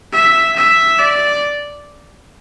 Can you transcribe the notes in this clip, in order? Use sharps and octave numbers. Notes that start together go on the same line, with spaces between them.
E5
E5
D5